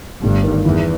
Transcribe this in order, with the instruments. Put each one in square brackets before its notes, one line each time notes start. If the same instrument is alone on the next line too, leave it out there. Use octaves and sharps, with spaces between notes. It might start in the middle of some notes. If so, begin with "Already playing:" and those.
[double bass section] G1 G2 [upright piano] A3
[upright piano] D#3
[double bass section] E2 [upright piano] E3